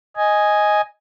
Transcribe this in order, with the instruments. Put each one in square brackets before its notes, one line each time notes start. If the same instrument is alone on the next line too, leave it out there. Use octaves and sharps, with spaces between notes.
[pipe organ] D#5 G#5